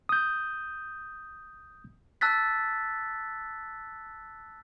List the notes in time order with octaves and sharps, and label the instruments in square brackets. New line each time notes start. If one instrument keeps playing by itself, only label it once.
[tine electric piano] D#6 G6
[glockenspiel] A5 E6 F#6 A6 B6